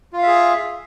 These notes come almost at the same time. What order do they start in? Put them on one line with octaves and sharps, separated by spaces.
F4 F5 E5 G#4